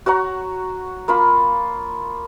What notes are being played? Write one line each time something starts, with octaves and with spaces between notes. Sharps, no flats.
F#4 C#5 F#5 A#5
A#3 F4 B5